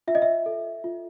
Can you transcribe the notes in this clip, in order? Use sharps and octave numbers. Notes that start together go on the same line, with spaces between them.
F4 E5
D#5
E5
A4
F4